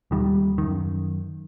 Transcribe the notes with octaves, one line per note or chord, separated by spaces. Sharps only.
D#2 D#3 G3
F#2 D#3